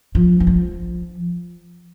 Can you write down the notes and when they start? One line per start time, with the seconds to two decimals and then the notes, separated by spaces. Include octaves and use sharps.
0.15 F3
0.40 E3
0.47 F3